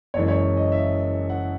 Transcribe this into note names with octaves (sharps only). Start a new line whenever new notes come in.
F#1 F#2 E3 G#3 C#5
C#5
D#5
E5
F#5